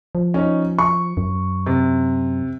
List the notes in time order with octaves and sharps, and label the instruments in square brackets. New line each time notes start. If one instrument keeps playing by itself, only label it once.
[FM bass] F3
[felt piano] C#4 D#4
C#6
[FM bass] F#2
[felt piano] C3